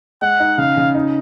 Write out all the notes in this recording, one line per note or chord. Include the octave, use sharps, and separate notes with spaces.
G#3 F#5
D#4
C#3 F5
C#3
D#4